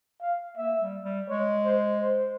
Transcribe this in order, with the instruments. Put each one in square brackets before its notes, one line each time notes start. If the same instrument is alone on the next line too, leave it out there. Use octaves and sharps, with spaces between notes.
[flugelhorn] F5
[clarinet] A#3 [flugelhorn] E5
[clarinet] G3
G3
[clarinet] G#3 [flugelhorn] C#5
[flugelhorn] C5
C5